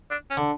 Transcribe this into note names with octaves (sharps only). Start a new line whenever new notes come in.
D4
C#4
D3